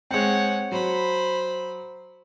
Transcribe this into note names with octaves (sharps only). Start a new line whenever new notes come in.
G#3 C4 C#5 F#5
F#3 C5 B5